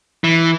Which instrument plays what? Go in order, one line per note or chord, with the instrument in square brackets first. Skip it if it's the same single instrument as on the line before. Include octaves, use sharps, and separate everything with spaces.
[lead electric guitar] E3